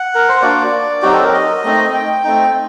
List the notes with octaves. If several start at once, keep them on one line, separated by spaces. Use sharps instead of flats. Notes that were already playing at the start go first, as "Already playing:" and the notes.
Already playing: F#5
A#4
C5
A#3 D4 F#4 D5
F#3 C4 D#4 F#4 G4
A4
A#4
D#5
A3 C4 D#4
G5
A3 C4 D#4